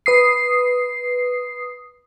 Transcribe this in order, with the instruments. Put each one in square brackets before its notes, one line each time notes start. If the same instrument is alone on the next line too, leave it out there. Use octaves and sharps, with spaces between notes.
[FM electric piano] B4 D#6 C7